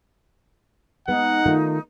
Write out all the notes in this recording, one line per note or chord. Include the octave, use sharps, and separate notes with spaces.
G#3 B3 D#4 F#5
D#3 A3 F4